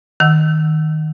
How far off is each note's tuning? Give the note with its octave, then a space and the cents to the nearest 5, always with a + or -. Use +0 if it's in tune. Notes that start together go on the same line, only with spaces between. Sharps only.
D#3 +0 F#5 +0 E6 +0